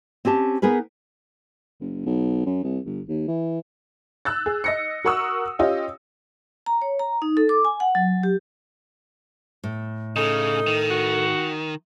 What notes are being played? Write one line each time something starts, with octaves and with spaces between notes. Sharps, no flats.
C4 C#4 G4 A5
B3 D#4 G#4 A#4 B4
F#1
B1
F#2
C2
G1
D#2
E3
E6 F#6 A6
G#4
D#5 A#6 C#7
F#4 A#4 F#5 C#6 D#6 E6
C#4 F4 G4 D#5
A#5
C#5
A#5
D#4
A4
D6
G#5
F#5
F#3
G4
A2
C#3 D#4 A4
D#3
F#4